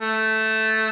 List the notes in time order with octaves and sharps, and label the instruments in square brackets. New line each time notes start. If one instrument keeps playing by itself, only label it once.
[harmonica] A3